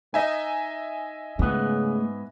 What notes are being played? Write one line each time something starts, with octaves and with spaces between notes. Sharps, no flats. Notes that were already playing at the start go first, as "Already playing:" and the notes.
D#4 D#5 E5 G#5
G#2 C#3 A3 B3